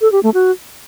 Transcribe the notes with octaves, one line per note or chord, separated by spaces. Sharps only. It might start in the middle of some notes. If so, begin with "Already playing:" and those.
A4
G4
A3
F#4